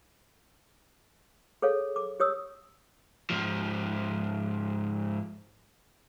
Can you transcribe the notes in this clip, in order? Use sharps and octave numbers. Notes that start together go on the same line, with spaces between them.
G#4 A4 C#5 F5
D6
G4 C#5 D#6 E6
G#2 F3